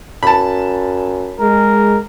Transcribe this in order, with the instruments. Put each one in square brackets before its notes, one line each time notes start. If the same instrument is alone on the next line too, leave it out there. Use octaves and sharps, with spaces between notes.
[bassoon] F#2 [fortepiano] A5 B5
[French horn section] G#3 [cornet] A#4